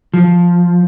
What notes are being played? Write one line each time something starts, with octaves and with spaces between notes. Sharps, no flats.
F3